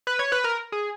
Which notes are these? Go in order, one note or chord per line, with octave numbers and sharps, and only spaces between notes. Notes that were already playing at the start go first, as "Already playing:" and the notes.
B4
C#5
B4
A#4
G#4